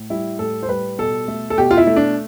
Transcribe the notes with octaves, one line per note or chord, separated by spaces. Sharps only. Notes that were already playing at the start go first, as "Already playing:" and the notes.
Already playing: A2
G3 E4
A2 A4
C5
G3 B4
B2 A4
A3
A4
B2 G4
F4
E4
A3
D4